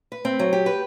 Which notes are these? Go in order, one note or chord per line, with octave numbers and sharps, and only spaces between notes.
B4
C4
F#3
G4
B4